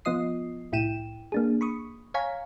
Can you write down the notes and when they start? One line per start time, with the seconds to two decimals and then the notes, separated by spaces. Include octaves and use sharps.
0.05 F3 B3 F4 D#5 D#6 C7
0.72 C2 A2 E4 G5 D#7 E7
1.32 A#3 D4 G#4
1.61 B5 C#6 D#6
2.14 C#5 F5 G#5 A#5 C#6 B6